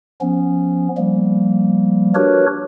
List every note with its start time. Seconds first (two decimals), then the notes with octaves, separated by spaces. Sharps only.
0.21 F3 B3 C#4
0.97 F3 G3 A#3
2.15 D4 F#4 G4 A#4 B4 C#5